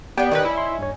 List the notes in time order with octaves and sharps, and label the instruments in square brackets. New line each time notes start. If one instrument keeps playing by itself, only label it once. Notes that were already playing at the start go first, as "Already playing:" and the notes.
[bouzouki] G3 D4 [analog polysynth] B3 [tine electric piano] G4 G5
[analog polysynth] D#3 B4 [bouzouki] C#4 D#4
[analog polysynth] E4
[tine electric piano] C6
G2 C#5